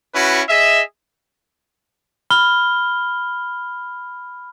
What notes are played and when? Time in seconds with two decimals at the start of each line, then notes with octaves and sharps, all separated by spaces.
0.15 C#4 E4 F#4 B4
0.49 G#4 D#5 E5
2.30 B5 F6 G7